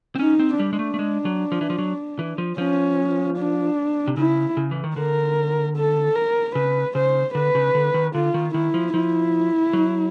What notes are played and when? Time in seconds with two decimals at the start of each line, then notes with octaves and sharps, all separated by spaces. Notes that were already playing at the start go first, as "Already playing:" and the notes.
0.15 C4
0.19 C#4 D#4
0.39 C4
0.59 G3 D4
0.73 G#3
0.79 A3
0.94 A3
0.99 G#3
1.25 F#3
1.52 F3
1.61 E3
1.70 F3
1.78 F#3
2.19 E3
2.38 F3
2.58 F3 C#4
3.38 D4
4.08 C3
4.17 C#3 E4
4.57 C#3
4.71 E3
4.84 D#3
4.96 D3 A#4
5.76 A4
6.15 A#4
6.55 C#3 B4
6.95 C#3 C5
7.35 D3 B4
7.55 C#3
7.75 D3
7.94 D#3
8.14 D3 F4
8.34 D#3
8.54 D#3 E4
8.74 F3
8.94 F3 E4
9.73 F#3